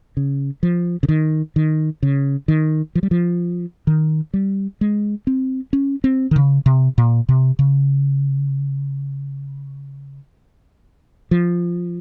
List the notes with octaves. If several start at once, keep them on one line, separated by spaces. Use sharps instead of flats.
C#3
F3
C#3
D#3
D#3
C#3
D#3
F3
G3
F3
D#3
G3
G#3
C4
C#4
C4
D#3
C#3
C3
A#2
C3
C#3
F3